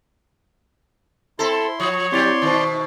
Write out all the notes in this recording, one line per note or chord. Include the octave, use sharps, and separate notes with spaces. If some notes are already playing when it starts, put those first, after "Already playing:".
C4 E4 A4 C6
F3 C#5
F#3 C4 E4 G4 D5 C6 A6
B2 D#3 C5 C#6